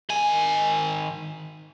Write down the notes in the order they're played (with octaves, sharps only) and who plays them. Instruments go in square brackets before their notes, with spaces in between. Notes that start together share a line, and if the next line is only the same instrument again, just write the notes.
[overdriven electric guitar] D#3 G#5